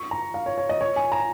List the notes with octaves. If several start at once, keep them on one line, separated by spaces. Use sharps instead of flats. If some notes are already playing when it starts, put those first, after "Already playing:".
Already playing: C#6
A#5
F5
C#5
C#5
D#5
C#5
G#5
A#5